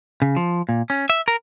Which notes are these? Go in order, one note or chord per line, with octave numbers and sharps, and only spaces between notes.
C#3
F3
A#2
C#4
E5
A#4